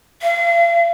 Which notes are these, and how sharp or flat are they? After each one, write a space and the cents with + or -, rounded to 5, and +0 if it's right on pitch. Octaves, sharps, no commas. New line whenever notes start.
F5 -40